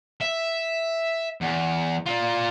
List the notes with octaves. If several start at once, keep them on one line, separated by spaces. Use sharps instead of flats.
E5
E2
F4 D5